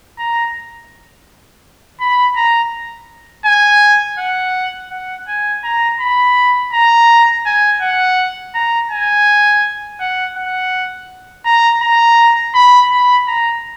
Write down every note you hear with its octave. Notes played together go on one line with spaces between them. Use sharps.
A#5
B5
A#5
G#5
F#5
F#5
G#5
A#5
B5
A#5
G#5
F#5
A#5
G#5
F#5
F#5
A#5
A#5
B5
B5
A#5